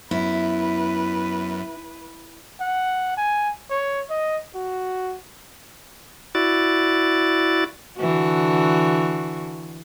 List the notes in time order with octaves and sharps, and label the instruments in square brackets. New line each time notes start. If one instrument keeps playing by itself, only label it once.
[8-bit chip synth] F#2 [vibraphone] B3 [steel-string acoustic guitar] E4 [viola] B4
[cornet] F#5
G#5
C#5
D#5
F#4
[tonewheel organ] E4 F#4 D5 A6
[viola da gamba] D3 E3 F#4